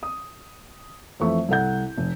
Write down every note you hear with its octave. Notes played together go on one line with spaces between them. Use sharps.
D#6
F2 E3 A3 E5 C#6
C2 A4 F#5 G6
F1